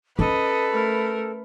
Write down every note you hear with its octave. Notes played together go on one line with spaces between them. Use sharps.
C#4 A4 B4 D#5
A3 A#4